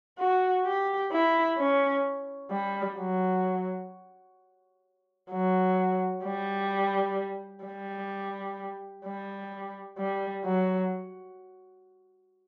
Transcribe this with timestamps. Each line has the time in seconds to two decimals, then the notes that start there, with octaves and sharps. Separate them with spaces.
0.19 F#4
0.65 G4
1.11 E4
1.58 C#4
2.51 G3
2.98 F#3
5.31 F#3
6.24 G3
7.65 G3
9.05 G3
9.98 G3
10.45 F#3